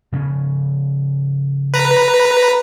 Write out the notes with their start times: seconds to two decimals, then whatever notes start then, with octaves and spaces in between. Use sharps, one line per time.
0.12 C#3 F3 C#4
1.74 B4 A#5